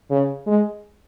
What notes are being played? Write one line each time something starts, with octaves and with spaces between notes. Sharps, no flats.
C#3
G#3